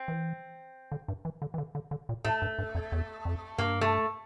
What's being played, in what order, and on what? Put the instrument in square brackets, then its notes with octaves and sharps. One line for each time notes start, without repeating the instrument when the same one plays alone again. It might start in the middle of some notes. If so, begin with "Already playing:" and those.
Already playing: [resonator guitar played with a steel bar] C4
[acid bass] E3
D3
G2
E3
D3
E3
D3
D3
D3
A#2
[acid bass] A2 [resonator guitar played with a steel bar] A3
[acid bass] G2
G2
F2
E2
F2
[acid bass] G2 [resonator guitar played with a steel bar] A#3
[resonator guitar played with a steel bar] A3